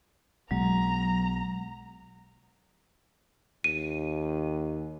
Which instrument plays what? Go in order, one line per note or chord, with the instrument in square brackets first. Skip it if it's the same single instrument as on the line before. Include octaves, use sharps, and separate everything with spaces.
[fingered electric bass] B1 B2 G#3 [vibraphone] F#3 [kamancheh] A#5
[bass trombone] D#2 [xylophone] D#7